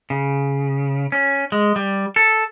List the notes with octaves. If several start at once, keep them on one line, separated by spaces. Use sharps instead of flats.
C#3
C#4
G#3
G3
A4